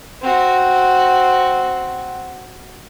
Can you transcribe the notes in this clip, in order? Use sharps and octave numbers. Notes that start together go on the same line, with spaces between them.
C4 F#4